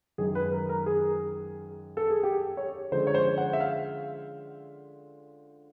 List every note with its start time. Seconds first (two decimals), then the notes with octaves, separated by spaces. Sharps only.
0.18 F#2 D#3 G#3 C#4 G#4
0.35 B4
0.52 A#4
0.69 A#4
0.86 G#4
1.97 A4
2.10 G#4
2.23 G4
2.57 C#5
2.92 D3 F3 G#3 C#4 C5
3.07 C#5
3.15 C5
3.38 F#5
3.53 E5
3.60 F5